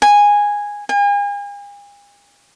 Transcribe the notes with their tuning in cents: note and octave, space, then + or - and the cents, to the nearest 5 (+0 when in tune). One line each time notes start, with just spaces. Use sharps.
G#5 -10
G#5 -40